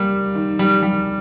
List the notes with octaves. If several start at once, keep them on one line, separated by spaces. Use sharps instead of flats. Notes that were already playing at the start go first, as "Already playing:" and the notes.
Already playing: G3 A#3
D#3
G3
G3